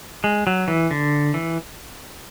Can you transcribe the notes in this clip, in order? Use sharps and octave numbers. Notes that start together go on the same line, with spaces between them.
G#3
F#3
E3
D3
E3